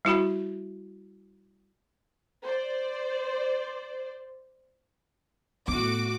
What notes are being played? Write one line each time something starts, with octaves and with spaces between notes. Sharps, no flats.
G3 E4 F#4 B5
C5 D5
A2 B3 F#4 D6